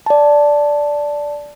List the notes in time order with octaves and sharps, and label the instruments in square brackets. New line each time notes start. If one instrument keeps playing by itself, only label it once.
[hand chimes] D5 A5